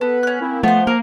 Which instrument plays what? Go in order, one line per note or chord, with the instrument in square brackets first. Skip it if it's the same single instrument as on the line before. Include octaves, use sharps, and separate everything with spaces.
[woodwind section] B3 B4 [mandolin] A4
[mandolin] C#4 F#6
[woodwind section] A#3 C4 E4
[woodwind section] F3 [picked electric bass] A3 [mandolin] B3 C5
[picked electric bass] A#3 [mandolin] A#4